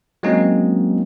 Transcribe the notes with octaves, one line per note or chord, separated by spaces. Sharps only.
F#3 G#3 A#3 C4 C#4 D#4